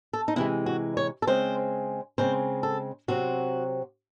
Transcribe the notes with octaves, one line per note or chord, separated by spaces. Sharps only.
A4
D#4
C3 E3 G#3 E4
F#4
C#5
A4
C#3 G#3 C4 C5
C#3 G#3 C4 C5
A4
C3 F#3 C4 F#4